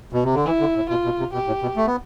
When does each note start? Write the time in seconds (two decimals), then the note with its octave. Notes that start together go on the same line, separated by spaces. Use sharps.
0.13 B2
0.24 C3
0.34 D3
0.45 E3 E4
0.60 D3
0.75 A2
0.90 B2 F4
1.05 B2
1.19 C3
1.33 B2 G4
1.47 A2
1.62 B2
1.77 A3
1.87 B3